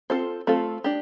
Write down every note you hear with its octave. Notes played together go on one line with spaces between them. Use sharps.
C4 F4 A4 C5
A3 C4 F4 A4
D4 G4